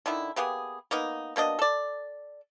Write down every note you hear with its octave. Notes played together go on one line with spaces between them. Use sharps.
D3 D#3 D#4 E4
A#3 B3 G4 G#4
A#3 B3 D#4
B2 A#3 D4 D#5
A4 D5